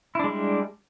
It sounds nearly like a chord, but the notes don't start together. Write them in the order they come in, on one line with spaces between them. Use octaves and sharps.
E4 D4 G#3 G3